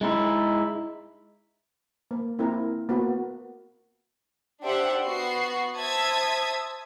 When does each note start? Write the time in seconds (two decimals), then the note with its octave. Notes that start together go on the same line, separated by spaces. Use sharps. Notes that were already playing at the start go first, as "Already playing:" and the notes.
0.01 G#3 D#4 E4
2.11 A#3
2.39 A#3 C4 E4 A#4
2.89 A#3 B3 F#4
4.62 D4 G4 C5 E5 F#5
5.05 B3 F#4 C7
5.76 C5 E5 A5 D#6 G#6 B6